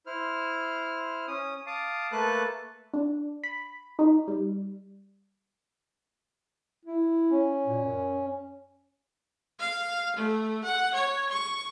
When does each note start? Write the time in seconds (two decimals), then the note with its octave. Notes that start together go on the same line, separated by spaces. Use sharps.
0.06 E4 C5 F6
1.28 C#4 D#6
1.66 F5 A5 D6 D#6
2.12 A3 A#3 A4 B4 A5 F#6
2.94 D4
3.44 B5
3.99 D#4
4.28 G3
6.85 E4
7.31 C#4
7.66 A#2
7.83 F#2
9.59 F5
10.16 A3
10.64 F#5
10.94 C#5
11.29 C#6